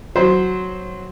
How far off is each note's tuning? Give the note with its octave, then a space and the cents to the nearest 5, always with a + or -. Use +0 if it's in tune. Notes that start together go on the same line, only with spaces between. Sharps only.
F#3 +0 C5 +0